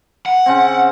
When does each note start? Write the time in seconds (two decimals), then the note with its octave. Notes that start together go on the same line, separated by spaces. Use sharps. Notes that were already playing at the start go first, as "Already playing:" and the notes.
0.26 F#5
0.46 C#3 C4